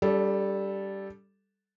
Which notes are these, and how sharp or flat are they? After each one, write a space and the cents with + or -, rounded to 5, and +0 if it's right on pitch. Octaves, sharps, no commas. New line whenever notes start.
G3 +0 D4 -45 A4 -10